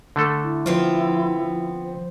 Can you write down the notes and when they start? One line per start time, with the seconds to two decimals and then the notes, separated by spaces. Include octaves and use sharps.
0.16 D3 A3 A4
0.43 E4
0.66 F3 B3 C4 F4
1.85 C5